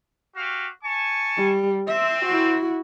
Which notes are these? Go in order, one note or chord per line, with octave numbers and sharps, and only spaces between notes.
F#4 G4 F5
G#5 A5 C#6
G3
C4 E5
E4 F#4